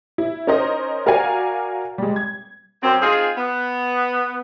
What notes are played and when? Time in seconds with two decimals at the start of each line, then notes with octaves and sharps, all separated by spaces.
0.18 E4
0.47 C#4 D#4 A#4 C5 D#5
1.06 F#4 A#4 D5 F5 G#5
1.98 G3 G#3
2.16 G#6
2.83 F#2 C4
3.02 C4 D#4 F4 G#4
3.37 B3